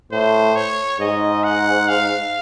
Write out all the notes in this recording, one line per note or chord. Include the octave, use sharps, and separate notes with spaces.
A2 C5
C#5
G#2 D#5
F#5
F5